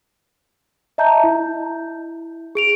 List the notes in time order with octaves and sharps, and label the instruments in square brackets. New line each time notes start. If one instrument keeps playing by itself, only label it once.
[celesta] D#5 E5 A5 A#5 G6
E4
G#4 D7 F7